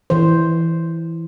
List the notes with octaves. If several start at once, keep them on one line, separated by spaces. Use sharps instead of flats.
E3 C5